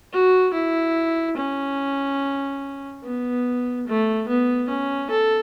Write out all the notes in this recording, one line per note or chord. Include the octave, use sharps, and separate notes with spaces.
F#4
E4
C#4
B3
A3
B3
C#4
A4